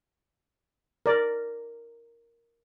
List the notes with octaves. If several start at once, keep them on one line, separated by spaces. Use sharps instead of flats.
A#4 D5